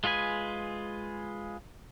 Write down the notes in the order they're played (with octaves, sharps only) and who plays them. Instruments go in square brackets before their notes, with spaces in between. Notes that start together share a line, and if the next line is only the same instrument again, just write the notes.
[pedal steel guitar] G#3 F4 G#4 B4 G#5